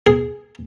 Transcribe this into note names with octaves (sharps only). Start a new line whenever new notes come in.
G#4